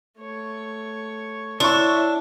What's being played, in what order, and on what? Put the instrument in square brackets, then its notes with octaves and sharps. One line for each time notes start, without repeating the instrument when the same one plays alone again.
[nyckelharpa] A3 C#5
[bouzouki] D4 [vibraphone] E4 C#5 [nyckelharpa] E5 [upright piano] C6 C#6